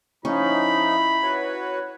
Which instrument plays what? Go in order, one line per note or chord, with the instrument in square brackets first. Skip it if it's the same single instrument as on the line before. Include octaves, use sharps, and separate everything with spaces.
[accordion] F3 D#4 [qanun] C#4 [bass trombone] E4 [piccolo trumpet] B5
[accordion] F#4 B4 C#5